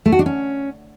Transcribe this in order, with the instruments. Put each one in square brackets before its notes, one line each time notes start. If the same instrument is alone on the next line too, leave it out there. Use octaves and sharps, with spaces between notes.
[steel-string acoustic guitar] A3
F#4
D4
C#4